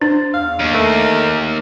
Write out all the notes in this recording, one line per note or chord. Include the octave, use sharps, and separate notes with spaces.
D4 C5
E2 F5
D#2
A3 A#4